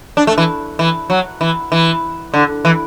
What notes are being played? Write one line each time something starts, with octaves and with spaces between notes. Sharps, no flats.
D4
A3
E3
E3
F#3
E3
E3
D3
E3